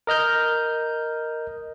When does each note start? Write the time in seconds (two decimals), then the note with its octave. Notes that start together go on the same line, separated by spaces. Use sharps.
0.07 A#4 D#5 F6 G6